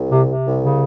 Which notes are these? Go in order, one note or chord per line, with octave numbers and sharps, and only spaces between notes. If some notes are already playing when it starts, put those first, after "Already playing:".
Already playing: C2
C3
C3
C2
C#3